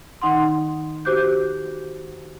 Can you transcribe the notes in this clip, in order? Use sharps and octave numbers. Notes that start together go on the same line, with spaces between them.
D#3 D#4 F#5 C6
F#4 G4 C5 D6 F#6 G6